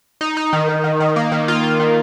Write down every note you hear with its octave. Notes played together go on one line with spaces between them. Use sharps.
D#4
D#4
D#3
D#3
D#3
D#3
A#3
D#3
F4
F4
D#3